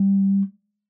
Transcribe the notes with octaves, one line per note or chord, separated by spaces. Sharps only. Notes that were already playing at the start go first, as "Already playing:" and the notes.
Already playing: G3